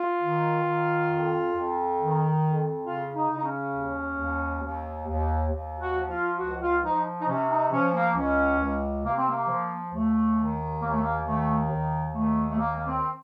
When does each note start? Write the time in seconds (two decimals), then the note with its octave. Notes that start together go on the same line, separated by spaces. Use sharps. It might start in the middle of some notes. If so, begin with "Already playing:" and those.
Already playing: F4
0.21 D#3
0.64 D#3
1.08 F2
1.53 F2
1.97 D#3
2.42 F2
2.85 C#3 F4
3.15 D#4
3.30 C#3
3.38 D#4
3.44 C#4
3.74 D#2
4.18 D#2
4.62 D#2
5.07 D#2
5.51 D#2
5.80 F#4
5.94 F3
6.10 F4
6.39 C#2 F#4
6.61 F4
6.83 F3 D#4
7.21 D#4
7.28 C3 C#4
7.49 D#4
7.72 F3 C#4
7.94 A#3
8.16 C#2 C#4
8.60 C#2
9.04 C3 A#3
9.16 C4
9.29 A#3
9.48 F3
9.92 D#2 A3
10.36 D#3
10.81 D#2 A#3
10.91 A3
11.02 A#3
11.26 D#3 A3
11.70 D#2
12.13 D#3 A3
12.51 A3
12.58 D#2 A#3
12.76 A#3
12.87 C4